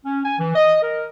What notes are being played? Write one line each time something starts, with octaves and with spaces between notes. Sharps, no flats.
C#4
G#5
E3
D#5
A#4